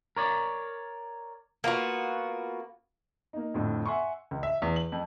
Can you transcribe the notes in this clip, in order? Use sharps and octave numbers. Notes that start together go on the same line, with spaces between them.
A#4 C#5 D5
A#3 B3 F4 F#4
A#3 D#4
F2 A2 D3
E5 F#5 G#5 C6 C#6
C#2
E5
E2
F#7
F2